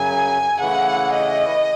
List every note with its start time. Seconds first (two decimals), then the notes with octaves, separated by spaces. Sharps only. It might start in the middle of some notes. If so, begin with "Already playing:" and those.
Already playing: F#2 C#3 F#3 G#5
0.59 C#3 E3 A3 E4 F#5
1.14 D#5